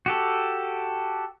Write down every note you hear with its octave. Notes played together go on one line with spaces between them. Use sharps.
F#4 G4 A4